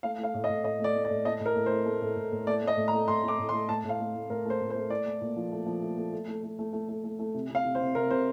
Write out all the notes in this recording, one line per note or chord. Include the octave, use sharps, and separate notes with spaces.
A3 F5
A3 F5
A2
D#5
A2
A2 D#5
A3 D5
A3
D5
A2
A3 D#5
A2
A#4
A2
A3 C5
A3
A2
A2
A2
A3 D5
A3
D#5
A2
A#5
A3
A2 C6
A3
D6
A2
C6
A3
A2 A5
A2
F5
A3
A3
A2 A#4
A3 C5
A2
C5
A3
A3 D5
A3
A#2
F3
A3
F3
A3
A3
A3
A3
A3
A3
A3
A3
A3
A3
C3
C3 F5
C3
C5
C3
C3 A#4
C3 C5